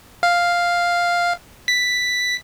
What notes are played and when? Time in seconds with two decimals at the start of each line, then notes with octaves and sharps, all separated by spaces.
0.23 F5
1.68 B6